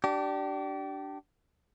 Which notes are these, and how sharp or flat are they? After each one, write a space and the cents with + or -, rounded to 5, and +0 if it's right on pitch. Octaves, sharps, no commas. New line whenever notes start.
D4 +0 G4 -30